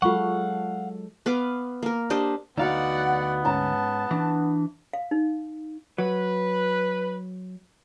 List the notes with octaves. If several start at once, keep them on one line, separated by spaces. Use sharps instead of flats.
F#3 G#3 F4 A4 F5 F#5 C#6
B3 B4 F5 D6
A#3 A#4
D4 G4 C5 D#5
D2 B3 D#4 F#4 D5 F5 F#5
G#2 C#4 A5 A#5
E3 D4
F5
D#4
F#3 B4